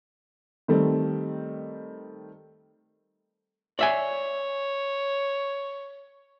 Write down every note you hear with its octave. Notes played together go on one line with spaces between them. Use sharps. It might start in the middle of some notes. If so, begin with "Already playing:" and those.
D#3 G3 A3 C4
C#5 D5 E5 G#5